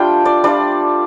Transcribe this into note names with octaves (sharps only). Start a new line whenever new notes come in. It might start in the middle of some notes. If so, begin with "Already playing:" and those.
Already playing: G3 A3 D4 F4 G5
D5
G3 D4 F4 D5